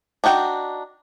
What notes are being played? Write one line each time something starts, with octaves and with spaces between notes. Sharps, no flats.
D4 D#4 F#4 G5